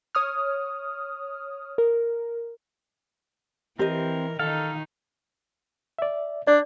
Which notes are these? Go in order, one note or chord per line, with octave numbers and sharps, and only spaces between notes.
C#5 D#6 F6
A#4
E3 C4 G4 A#4 D#5
D#3 D#4 A4 F5
D5 E5
D4 D5